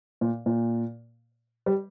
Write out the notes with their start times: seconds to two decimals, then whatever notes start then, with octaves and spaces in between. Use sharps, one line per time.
0.21 A#2
0.46 A#2
1.66 G3